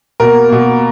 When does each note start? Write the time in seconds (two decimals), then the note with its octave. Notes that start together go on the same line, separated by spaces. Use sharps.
0.20 B2 A#3 A#4
0.49 B2 A#3